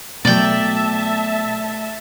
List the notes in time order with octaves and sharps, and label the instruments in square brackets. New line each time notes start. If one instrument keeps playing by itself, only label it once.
[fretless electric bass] B2 F#3 [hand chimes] A3 [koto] D5 G5 [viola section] E5 A5